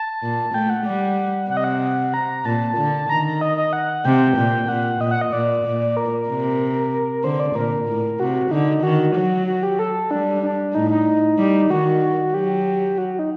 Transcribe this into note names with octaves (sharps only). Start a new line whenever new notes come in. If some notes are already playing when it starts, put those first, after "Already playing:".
Already playing: A5
A#2
A3 G5
F#5
G3
C3 F#5
D#5
F#5
A#5
A#2 A5
D3
D#3 A#5
A#5
D#5
D#5
F#5
C3 G5
A#2
A#2 F#5
A#2 D#5
F#5
D#5
A#2 D5
A#2
A#4
C3
D3 C5
D5
A#2 A#4
A2
C3 F#4
D3 D#4
D#3 F#4
F#3
F#4
G4
A4
G3 D4
D4
A2 D#4
D#4
G3
D#3 F#4
F#3 G4
F#4
D#4